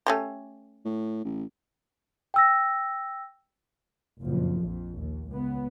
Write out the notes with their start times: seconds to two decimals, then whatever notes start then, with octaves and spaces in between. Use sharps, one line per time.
0.07 A3 C#4 G4
0.85 A2
1.24 A1
2.34 G5 E6 A#6
4.24 F#1 F2 A#2 F3
4.61 A#1 F2
4.95 D#2
5.28 C#2 B3